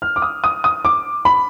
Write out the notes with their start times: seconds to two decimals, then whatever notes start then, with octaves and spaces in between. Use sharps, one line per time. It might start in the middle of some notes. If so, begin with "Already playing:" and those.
0.02 F6
0.16 D6
0.22 D#6
0.44 D#6
0.64 D#6
0.85 D6
1.25 B5